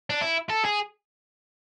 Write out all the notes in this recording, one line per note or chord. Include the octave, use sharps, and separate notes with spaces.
D4
E4
A4
G#4